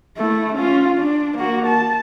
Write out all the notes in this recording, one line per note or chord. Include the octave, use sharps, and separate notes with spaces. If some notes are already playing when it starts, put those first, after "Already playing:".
A3 E4
C#4 F4
D4
A#3 F#4
A5